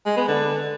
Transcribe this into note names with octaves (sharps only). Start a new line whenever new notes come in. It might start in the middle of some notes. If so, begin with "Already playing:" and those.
G#3
B3
D3